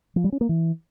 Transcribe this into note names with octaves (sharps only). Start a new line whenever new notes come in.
F3
G3
C#4
A#3
E3